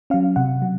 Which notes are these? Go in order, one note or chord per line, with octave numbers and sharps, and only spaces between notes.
F#3 C#4 F5
C3 F#5
F#3